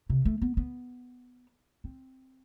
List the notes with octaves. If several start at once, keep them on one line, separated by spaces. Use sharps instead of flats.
C3
A3
B3
B3
C4